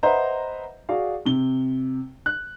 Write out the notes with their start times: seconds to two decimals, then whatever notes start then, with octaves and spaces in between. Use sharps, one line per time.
0.03 B4 C5 D#5 E5 F#5 A#5
0.89 F#4 G#4 D5 F5
1.26 C3 G7
2.26 F#6